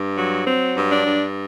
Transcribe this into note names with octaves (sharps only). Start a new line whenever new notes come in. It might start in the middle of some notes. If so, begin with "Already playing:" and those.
Already playing: G2
F#3
F#3 C4
G2
D4
G2